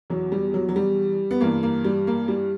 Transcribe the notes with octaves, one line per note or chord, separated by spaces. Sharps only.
E2 B2 F#3
G3
F#3
F#3
G3
B3
G2 E3 A#3
A#3
G3
A#3
G3